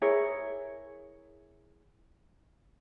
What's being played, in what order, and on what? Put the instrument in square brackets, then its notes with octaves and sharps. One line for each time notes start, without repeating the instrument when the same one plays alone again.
[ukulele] E4 G#4 A#4 C#5